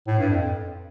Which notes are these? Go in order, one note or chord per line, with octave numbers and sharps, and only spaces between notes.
A2
G2
F2